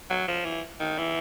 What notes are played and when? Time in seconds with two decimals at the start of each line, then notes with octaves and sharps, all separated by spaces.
0.10 F#3
0.28 F3
0.46 E3
0.80 D#3
0.98 E3